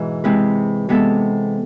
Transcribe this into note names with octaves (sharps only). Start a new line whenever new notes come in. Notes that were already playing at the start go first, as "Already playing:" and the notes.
Already playing: G#2 B2 E3
C3 G#3 C4 E4 B4
C3 G#3 B3 E4 A4